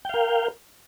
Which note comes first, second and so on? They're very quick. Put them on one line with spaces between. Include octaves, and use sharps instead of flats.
G5 F5 A#4